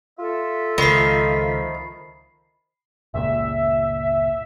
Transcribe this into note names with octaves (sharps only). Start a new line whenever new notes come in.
F4 A4 E5
C#2 D#3 F3 B5 C7
G1 C#2 A#2 E5